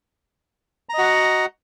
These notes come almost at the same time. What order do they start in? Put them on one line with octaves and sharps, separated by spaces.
A#5 D#5 F#4 F#5